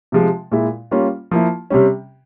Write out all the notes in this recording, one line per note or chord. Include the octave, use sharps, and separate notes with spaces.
C3 F3 G#3
A#2 G#3 E4
G3 A#3 C#4 F4
F3 A#3 E4
C3 G3 C#4